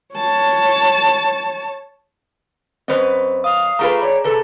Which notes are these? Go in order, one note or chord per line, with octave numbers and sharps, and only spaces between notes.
C#5 A5
F#2 C4 B4 C5 D#5
F5 D#6
A3 F4 G#4 B4 A#5
C#5 D5
C3 A4 B4